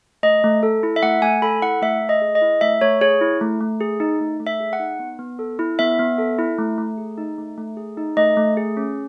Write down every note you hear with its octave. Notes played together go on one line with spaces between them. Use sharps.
A3 D#5
A3
A4
E4
E5
A3 F#5
A3 G#5
A4 B5
E4 F#5
A3 E5
A3
D#5
G#4
D#5
E4
A3 E5
A3 C#5
G#4 C#5
E4
A3
A3
G#4
D#4
A3
A3
E5
G#4
F#5
D#4
B3
B3
A4
E4
B3 E5
B3
A4
E4
A3
A3
G#4
D#4
A3
A3
G#4
D#4
A3 D#5
A3
G#4
C#4